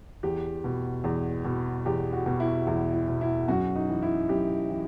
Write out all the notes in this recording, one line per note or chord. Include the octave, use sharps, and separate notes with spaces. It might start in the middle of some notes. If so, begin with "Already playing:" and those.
E2 G4
B2
E2
B2
E2 G4
F#4
B2
E4
E2 E4
E4
B2
E4
F#2 F#4
D#4
E3
E4
F#2 G4
E3